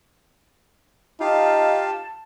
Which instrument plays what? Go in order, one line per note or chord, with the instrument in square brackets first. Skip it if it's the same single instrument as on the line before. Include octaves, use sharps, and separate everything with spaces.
[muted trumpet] D#4 [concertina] F4 G4 F5 [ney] A5